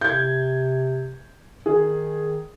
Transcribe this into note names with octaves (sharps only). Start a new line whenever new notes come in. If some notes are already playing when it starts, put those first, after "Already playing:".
C3 G6 G#6
D#3 G#4